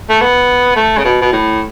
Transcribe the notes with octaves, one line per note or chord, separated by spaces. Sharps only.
A3
B3
A3
C#3
B2
B2
A2